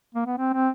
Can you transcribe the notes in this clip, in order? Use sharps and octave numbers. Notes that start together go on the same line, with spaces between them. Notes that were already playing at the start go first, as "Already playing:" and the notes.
A#3
B3
C4
C4